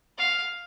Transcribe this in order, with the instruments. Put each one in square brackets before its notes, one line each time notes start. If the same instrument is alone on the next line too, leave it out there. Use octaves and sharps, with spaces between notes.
[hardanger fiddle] F5